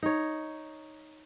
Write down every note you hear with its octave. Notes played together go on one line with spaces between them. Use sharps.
D#4 C#5